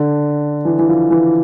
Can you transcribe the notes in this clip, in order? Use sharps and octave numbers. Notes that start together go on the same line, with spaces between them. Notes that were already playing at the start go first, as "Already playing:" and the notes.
Already playing: D3
E3
E3
F3
E3